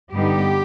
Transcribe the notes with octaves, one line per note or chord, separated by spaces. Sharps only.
G2 D3 G3 B3 D#4 G4